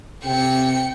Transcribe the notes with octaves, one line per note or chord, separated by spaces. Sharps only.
C3 G5 C#7